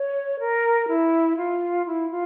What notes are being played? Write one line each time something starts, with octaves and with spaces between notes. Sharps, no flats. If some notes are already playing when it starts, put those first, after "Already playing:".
Already playing: C#5
A#4
E4
F4
E4
F4